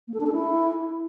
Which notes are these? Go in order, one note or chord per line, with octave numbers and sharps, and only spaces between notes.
A#3
A4
D4
A4
E4